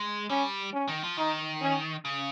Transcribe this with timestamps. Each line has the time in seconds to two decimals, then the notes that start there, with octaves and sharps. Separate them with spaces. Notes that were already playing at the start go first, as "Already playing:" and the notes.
Already playing: G#3
0.30 G3 C#4
0.73 C#4
0.88 D#3
1.03 F3
1.17 D#3 D#4
1.62 C#4
2.05 C#3